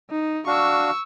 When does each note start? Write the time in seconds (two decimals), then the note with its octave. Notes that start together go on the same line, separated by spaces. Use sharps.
0.10 D#4
0.47 D4 F#4 F5 C#6 E6